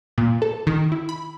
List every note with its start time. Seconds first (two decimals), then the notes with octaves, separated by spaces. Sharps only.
0.18 A#2
0.42 A4
0.67 D#3
0.92 E4
1.09 B5